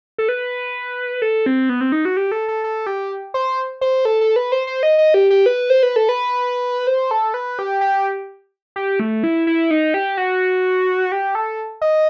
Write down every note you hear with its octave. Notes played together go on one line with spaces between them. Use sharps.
A4
B4
A4
C4
B3
C4
D#4
F#4
G4
A4
A4
A4
G4
C5
C5
A4
A4
B4
C5
C5
D#5
D#5
G4
G4
B4
C5
B4
A4
B4
C5
A4
B4
G4
G4
G4
A3
E4
E4
D#4
G4
F#4
G4
A4
D#5